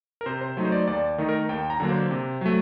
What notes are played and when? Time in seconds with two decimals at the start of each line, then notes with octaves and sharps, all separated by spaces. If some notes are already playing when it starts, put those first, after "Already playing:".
0.21 A#4
0.26 C3 C5
0.41 C5
0.57 F#3 A3 D#4
0.65 C5
0.72 D5
0.87 D#2 D5
1.18 D#3 A3 D#4
1.29 A#4
1.49 D#2 G5
1.70 A#5
1.80 D3 F#3 A#3 D4
1.90 C5
2.11 C3
2.41 F#3 A3